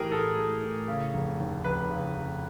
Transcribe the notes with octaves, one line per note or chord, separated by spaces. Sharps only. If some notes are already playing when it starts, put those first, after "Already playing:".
Already playing: A2 E3 A3 G4 G#4 A#4
A2 A4
A3
A2
C#3
F1
D#2
F1 B4
C#3
F1